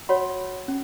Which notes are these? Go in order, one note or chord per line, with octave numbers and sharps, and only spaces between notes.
F#4 C#5 F#5 B5
C#4